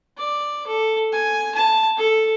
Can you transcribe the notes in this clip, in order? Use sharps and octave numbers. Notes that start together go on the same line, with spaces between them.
D5
A4
G#5
A5
A4